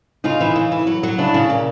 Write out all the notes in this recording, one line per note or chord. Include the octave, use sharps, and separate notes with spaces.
C#3 D#4 F4
E3
C#3
E3
F#3
F#3
C#3 D4 E4
C#3
A#2